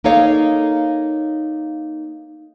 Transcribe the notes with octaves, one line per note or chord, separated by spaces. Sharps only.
A#3 D#4 A4 C#5 F5